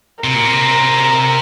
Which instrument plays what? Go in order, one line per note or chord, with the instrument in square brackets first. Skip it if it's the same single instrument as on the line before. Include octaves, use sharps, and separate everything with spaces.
[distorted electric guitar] C3 [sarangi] A#4
[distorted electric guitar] A#2
C3